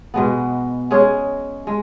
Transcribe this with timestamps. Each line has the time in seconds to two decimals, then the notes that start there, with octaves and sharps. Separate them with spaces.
0.14 B2 G#3 B3
0.91 G#3 C#4 G#4 C#5
1.67 G#3